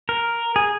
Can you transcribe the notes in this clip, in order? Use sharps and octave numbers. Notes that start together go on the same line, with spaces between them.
A#4
G#4